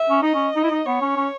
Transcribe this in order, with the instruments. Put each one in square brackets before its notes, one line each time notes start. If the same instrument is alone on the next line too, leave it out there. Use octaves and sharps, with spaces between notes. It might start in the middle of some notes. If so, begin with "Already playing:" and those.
Already playing: [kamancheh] E5
[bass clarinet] C#4
[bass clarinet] D#4 [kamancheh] D#5
[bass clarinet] C#4
D#4
E4
D#4
[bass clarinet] B3 [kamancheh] C#5
[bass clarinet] C#4
C#4